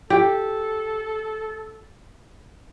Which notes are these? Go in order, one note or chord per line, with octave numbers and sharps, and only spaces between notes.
G4 A4